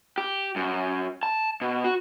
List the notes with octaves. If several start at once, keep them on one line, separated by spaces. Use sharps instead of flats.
G4
F#2
A5
B2
F#4